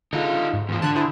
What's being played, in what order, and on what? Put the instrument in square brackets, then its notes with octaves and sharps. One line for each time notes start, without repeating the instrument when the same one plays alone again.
[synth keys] D3 G#3 [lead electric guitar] D#4 F4
[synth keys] D3
G#2
[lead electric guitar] E2 F3
[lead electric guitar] D3 [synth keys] A5 F#6 G#6
[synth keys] E4 G#4 C5